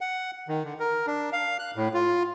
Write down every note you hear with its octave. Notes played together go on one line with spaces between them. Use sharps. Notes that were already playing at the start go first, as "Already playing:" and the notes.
F#5
D#3
D3
A#4
D4
F5
F#6
A2
F4